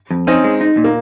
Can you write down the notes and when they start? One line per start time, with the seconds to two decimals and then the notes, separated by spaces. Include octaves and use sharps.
0.11 F2
0.27 C4 C#4 D#4
0.44 G#3
0.61 D#4
0.77 A#2
0.84 A#3